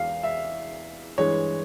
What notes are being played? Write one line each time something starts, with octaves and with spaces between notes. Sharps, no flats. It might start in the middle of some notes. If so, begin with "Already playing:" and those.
Already playing: E2 E3 G#3 F5
E5
G2 E3 G#3 C#5